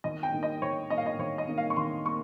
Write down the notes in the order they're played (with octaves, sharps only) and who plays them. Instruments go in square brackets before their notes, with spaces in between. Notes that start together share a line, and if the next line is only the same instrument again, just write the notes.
[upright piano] D#2 D#5
G5
D#3 A#3
D#5
D#2 C#5
D#3 A#3 D#5
F5
D#5
D#2 C#5
D#5
D#3 A#3
F5
C#6
D#2 C6
A#3 C#6